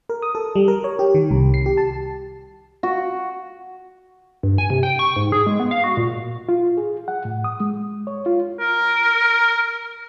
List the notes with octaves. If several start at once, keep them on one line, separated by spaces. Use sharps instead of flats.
A#4
D#6
A4
G3
A#4
C#5
G4
D#3
C2
C7
G4
A5
F#4
G2
G#5
C3
G5
C#6
G#2
G#4
G#3
B3
F5
F#4
A#2
F4
G#4
F#5
A2
D#6
G#3
C#5
F4
A#4